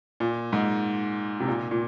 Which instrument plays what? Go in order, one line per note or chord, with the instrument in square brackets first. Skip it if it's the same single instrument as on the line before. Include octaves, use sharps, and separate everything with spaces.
[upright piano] A#2
G#2
C3
A#2
A#2